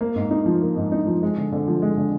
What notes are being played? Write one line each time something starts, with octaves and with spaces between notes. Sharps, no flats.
A#3
G#2
D#4
F3
A#3
G#2
D#4
F3
G#3
D3
D3
F3
G#3
D3